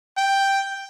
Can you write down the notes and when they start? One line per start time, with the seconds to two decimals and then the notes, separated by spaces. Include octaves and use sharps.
0.18 G5